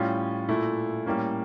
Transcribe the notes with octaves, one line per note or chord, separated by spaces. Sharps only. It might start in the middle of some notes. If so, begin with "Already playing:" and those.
Already playing: A2 G3 C#4 F4
A#2 A3 E4
A2 G3 A#3 C#4